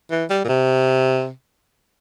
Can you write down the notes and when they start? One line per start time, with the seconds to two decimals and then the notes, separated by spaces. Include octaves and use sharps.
0.11 E3
0.30 G3
0.44 A#2
0.49 C3